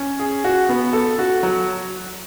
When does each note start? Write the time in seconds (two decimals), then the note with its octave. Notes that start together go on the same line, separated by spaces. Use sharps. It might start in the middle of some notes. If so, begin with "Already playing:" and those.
Already playing: C#4
0.20 G#4
0.44 F#4
0.69 B3
0.93 A4
1.19 F#4
1.43 F#3